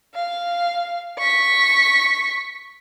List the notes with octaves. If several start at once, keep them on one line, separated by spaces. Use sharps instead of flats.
F5
C#6 B6